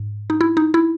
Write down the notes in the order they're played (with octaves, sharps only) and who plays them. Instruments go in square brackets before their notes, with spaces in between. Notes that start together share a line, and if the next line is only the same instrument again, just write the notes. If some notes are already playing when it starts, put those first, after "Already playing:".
Already playing: [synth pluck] G#2
D#4
E4
D#4
E4